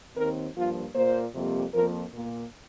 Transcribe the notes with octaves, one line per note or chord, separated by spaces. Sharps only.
D#2 D#3 C4 A#4
G2 F3 A#3 F4
A#2 A#3 C5
F2 C3 G3 A#3
F2 F3 A#3 A#4
A#2 A#3